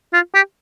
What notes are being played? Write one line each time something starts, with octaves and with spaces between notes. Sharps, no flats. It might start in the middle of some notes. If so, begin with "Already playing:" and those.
F4
G4